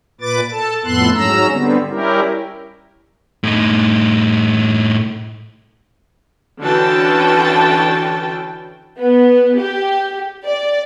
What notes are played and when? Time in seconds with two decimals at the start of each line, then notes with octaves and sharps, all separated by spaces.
0.21 A#2 B4 D6 A6
0.52 A4 A5
0.84 F2 A2 B3 A4 C6 F#6
1.14 G#2 F#3 C#4 A#5 E6
1.50 D3 G3 B3 C4
1.90 G3 C#4 E4 G4 A#4
3.43 A2 D#4
6.62 D3 E3 C#4 F#4 G5 A5
9.00 B3
9.60 G4
10.46 D5